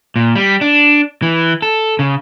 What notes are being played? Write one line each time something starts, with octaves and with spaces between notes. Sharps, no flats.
A#2
G3
D4
E3
A4
C#3